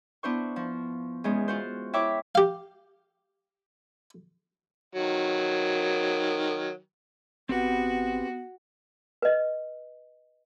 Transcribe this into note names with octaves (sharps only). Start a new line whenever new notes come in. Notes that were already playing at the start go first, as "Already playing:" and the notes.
B3 D4 E4 C5 C#6
F3 C#6
E2 G#3 C#4
F4 F#4 C5
E4 C#5 E5 G5 C#6 D6
G4 F5
D#3 F#3
G#1 B3 C4 F#4 G4 B4
B4 D#5